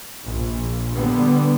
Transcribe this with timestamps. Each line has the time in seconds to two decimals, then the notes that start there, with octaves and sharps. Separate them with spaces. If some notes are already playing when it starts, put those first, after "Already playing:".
0.24 A#1
0.94 D3 G3 B3